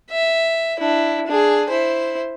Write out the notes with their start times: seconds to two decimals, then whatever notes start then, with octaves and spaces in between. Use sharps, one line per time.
0.10 E5
0.79 D4 E4
1.26 D4 G#4
1.69 E4 C5